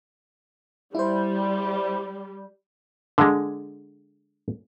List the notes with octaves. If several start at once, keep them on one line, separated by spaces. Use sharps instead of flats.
G3 E4 C5
D3 G#3